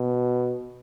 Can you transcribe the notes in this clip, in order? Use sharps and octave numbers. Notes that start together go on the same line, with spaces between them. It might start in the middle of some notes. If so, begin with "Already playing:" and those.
Already playing: B2